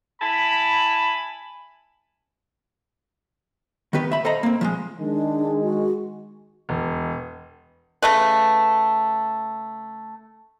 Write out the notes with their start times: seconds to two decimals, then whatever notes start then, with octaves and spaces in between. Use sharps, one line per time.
0.21 E4 G#5 A5 B5
3.93 D#3 B3 G4 B4
4.11 E5 B5
4.25 A4 C5 D#5 F5 A#5 B5
4.43 A#3 C4
4.61 F3 F#3 G#3
5.00 D#3 G#3 D4
5.62 F#4
6.69 E1
8.02 C#3 A3 B4